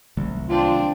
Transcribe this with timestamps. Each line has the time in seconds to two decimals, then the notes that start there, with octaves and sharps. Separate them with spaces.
0.17 C2 D#3 F#3 A3
0.49 C4 D4 F4